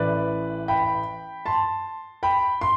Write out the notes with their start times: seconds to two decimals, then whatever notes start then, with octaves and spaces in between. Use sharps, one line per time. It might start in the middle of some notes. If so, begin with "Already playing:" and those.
Already playing: A1 A2 E3 B4 D5
0.68 G5 B5
1.46 A5 C6
2.23 G5 B5
2.61 C6